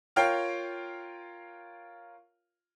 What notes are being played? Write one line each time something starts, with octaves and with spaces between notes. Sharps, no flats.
F4 A#4 C#5 F5 G5